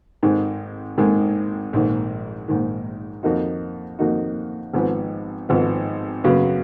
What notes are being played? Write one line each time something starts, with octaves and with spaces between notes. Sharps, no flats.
G#1 G#2 D#3 G#3
G#1 G#2 D#3 G#3
A#1 G#2 D#3
A#1 G#2 D#3
F2 D#3 A#3 D#4 F#4
F2 D#3 A#3 D#4 F#4
G#1 G#2 F3 B3
G#1 G#2 F3 B3
F#2 C#3 F#3 B3